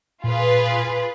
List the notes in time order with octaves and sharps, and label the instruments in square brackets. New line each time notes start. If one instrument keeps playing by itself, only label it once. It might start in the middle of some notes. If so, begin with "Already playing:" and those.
[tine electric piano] A#2 [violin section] F4 G#4 B4